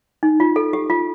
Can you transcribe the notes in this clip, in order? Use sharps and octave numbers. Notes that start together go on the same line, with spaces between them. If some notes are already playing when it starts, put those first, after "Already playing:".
D#4
F4
A4
G4
F4